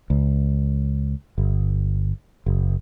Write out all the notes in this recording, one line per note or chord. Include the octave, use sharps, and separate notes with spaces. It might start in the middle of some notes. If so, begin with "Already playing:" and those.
C#2
G1
F#1